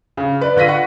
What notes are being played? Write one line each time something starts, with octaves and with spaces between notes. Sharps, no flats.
C#3
B4 D5
D3 F4 A#6 B6 D#7
F#5 C#6